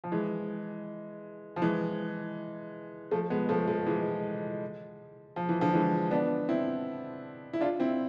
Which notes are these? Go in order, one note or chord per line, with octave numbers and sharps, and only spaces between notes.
F3
E3 G#3
F3
E3 G#3
F3 A3
G#3 B3
F3 A3
F3 A3
E3 G#3
F3
E3
D3 F3
E3 G#3
B3 D4
C4 E4
E4
D4 F4
C4 E4